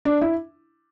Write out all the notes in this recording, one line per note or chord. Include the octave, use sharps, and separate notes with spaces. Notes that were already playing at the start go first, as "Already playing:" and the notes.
D4
E4